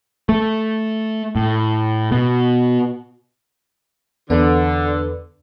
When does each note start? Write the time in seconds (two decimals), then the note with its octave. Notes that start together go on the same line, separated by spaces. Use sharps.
0.29 A3
1.36 A2
2.12 B2
4.30 E2 D3 B3 B4